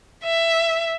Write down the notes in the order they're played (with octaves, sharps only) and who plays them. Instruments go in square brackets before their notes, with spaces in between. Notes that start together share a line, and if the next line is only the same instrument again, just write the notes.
[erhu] E5